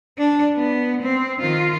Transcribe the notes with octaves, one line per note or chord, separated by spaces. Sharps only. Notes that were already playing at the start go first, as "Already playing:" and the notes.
D4
B3
C4
D#3 F4